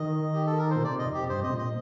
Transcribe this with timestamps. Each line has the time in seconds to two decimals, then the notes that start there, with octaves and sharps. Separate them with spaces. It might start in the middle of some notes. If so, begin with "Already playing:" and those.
Already playing: D#3 D#5
0.34 G4
0.46 A4
0.58 A#4
0.71 C5
0.76 A#2
0.83 C3 D5
0.99 D#5
1.06 F2
1.14 G4
1.29 G2 C5
1.43 C3 D#5
1.52 A#2
1.59 D#5